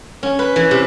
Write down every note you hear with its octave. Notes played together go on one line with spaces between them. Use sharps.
C#4
B4
E3
C3